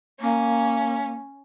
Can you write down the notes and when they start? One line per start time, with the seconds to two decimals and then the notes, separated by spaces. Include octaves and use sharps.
0.21 A#3 C#4